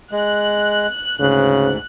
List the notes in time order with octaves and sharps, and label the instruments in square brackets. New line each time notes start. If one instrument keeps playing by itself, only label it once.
[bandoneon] G#3 [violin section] F#6
[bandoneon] D2 G#2 [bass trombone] C#3